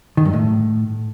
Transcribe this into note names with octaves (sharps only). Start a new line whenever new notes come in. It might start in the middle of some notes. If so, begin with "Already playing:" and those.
D#3
G2
A2